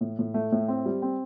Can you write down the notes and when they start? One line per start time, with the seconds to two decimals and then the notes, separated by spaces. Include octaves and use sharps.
0.01 A2
0.19 A2
0.34 A3
0.52 A2
0.68 C4
0.86 G3
1.02 C4